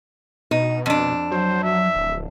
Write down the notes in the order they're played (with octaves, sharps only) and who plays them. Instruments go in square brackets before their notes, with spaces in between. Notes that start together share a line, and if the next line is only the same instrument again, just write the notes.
[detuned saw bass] B2 [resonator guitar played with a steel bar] D#4
[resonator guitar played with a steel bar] F2 D4
[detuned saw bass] F#3 [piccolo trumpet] C5
[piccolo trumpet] E5
[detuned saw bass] D1